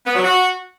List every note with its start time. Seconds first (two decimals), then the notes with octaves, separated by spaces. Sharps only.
0.06 B3
0.15 F#3
0.25 F#4